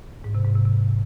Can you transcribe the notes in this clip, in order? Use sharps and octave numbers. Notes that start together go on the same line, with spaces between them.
G#2
C3
G#2
C3
C3